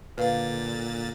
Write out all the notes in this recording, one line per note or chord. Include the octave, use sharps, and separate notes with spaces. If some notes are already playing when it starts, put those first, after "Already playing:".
A#2 D3 B4 F5 A6